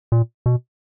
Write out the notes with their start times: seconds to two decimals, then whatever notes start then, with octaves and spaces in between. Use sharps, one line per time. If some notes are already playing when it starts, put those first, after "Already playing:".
0.12 A#2
0.46 B2